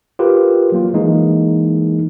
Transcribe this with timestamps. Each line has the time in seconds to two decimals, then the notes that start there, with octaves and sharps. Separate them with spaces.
0.19 F4 G4 A#4 B4
0.72 F#3 A#3 F4
0.94 E3 G#3 A#3 D#4 G#4